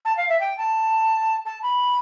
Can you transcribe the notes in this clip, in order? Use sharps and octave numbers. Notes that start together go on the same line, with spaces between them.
A5
F5
E5
G5
A5
A5
B5